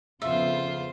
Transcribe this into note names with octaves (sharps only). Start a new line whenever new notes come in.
F2 C#3 B3 F4 C5 E5